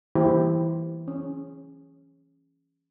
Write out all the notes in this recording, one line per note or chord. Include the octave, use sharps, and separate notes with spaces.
E3 G3 A#3 E4 G4 C5
C#4